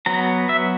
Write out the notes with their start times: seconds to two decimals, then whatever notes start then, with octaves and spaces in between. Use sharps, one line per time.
0.06 F#3 B3 A#5
0.49 E5